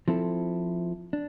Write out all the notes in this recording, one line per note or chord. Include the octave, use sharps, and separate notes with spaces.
F3 C4 E4 A4
D4